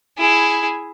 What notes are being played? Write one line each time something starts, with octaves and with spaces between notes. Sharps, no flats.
E4 G#4